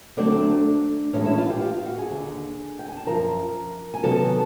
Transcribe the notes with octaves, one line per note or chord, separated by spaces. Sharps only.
D2 D3 F#3 A3 C4 D4 D5
A2 E3 G#3 C#4 C#5
E4 E5
F4 F5
G4 G5
F4 F5
F4 F5
F#4 F#5
G#4 G#5
D#2 D3 F3
G5
G#5
A5
F#2 C#3 F3 A#4 A#5
G#5
C3 D#3 F#3 B3 A4 A5